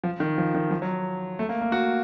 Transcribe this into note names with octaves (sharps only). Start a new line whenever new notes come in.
F3
D#3
F3
D#3
F3
F#3
A3
A#3
A#3
F#4